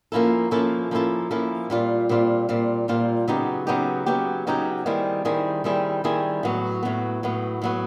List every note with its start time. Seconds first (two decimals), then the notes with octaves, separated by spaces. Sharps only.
0.12 F3 A#3 C#4 E4 A4
0.51 F3 A#3 C#4 E4 A4
0.91 F3 A#3 C#4 E4 A4
1.31 F3 A#3 C#4 E4 A4
1.70 A#2 G3 C4 F4
2.09 A#2 G3 C4 F4
2.49 A#2 G3 C4 F4
2.88 A#2 G3 C4 F4
3.28 C#3 F#3 B3 D#4 G4
3.67 C#3 F#3 B3 D#4 G4
4.06 C#3 F#3 B3 D#4 G4
4.47 C#3 F#3 B3 D#4 G4
4.86 D#3 G3 C4 E4 G#4
5.25 D#3 G3 C4 E4 G#4
5.64 D#3 G3 C4 E4 G#4
6.04 D#3 G3 C4 E4 G#4
6.43 A2 F#3 B3
6.83 A2 F#3 B3
7.23 A2 F#3 B3
7.62 A2 F#3 B3